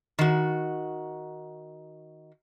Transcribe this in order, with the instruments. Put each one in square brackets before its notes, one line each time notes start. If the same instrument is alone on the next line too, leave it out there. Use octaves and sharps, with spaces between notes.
[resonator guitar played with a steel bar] D#3 F#4